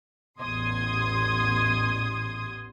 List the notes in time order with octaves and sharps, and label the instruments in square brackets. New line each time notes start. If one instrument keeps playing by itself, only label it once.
[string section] A1 E2 C6 D#6 G#6